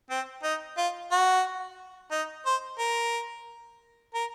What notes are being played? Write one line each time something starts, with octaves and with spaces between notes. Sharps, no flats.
C4
D#4
F4
F#4
D#4
C5
A#4
A#4